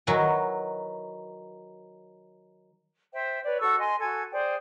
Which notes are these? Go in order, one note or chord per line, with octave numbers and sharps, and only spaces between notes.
D#3 F#3 E4 B4 G#5
C5 E5 G5
B4 C#5 D5
F#4 A4 C#6 E6
D#5 G#5 C6
F#4 A4 G#5 G#6
G#4 C5 D5 G5